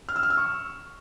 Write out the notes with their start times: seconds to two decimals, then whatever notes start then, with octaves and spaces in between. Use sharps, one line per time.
0.09 F6
0.16 E6
0.23 F6
0.30 E6
0.37 C#6